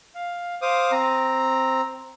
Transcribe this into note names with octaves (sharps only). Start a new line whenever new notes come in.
F5
C5 F5 D6 D#6
C4 A#5